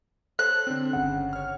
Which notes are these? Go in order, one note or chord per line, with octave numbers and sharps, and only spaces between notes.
A4 C5 C#5 F#6
D3 C4
G1 C#3 F#5
C#5 F6